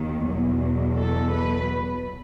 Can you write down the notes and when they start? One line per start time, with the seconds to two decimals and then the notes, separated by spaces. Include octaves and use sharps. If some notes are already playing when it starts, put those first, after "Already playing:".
Already playing: D#2 D#3
0.25 E2 B2 F#3
0.96 A4
1.31 B4